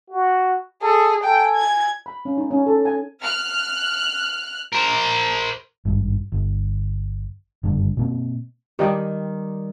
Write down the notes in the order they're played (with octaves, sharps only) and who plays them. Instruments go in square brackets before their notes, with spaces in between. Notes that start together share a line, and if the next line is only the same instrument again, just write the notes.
[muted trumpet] F#4
[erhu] G#4 [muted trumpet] A4
[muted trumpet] A4 [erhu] G5 [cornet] G#5
[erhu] G#6
[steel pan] B5
C#4
D#4
C#4
A4
G#5
[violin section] F6 F#6
[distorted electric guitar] A#4 C5
[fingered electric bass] G#1 G2
G1
F#1 G2 D3
B2 A#3 C4
[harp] D#3 G3 [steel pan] G4 D5 D#5